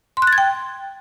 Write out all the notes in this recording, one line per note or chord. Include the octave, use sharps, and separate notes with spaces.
C6
F#6
A6
G#6
G5